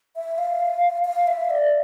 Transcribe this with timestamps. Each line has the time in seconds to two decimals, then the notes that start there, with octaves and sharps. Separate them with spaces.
0.16 E5
0.38 F5
1.05 F5
1.27 E5
1.50 D5